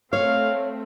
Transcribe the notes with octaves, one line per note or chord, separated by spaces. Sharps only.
A3 C4 C#5 F5